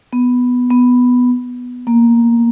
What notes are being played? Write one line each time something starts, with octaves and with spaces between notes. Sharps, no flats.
B3
B3
A#3